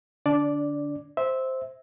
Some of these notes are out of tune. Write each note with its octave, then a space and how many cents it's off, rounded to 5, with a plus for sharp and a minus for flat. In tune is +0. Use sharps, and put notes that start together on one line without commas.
D3 +0 D4 -20 D5 +0
C5 +0 E5 -15